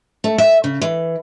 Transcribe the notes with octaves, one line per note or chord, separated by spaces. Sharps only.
A3
E5
C#3
E3